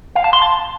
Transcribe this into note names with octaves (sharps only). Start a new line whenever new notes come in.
F5
A5
C6
A5